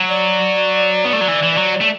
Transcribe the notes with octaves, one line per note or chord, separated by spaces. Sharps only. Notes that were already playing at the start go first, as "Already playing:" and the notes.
Already playing: F#3
D5
B3
A3
F#3
E3
E3
F#3
A3